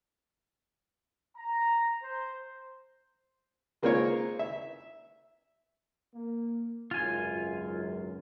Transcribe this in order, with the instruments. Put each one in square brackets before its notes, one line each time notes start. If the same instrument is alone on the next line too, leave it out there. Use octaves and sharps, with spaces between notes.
[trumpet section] A#5
C5
[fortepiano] G#3 A#3 C4 F4 A#4 C#5
E5
[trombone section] A#3
[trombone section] G#1 C#2 F#2 [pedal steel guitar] F4 G#5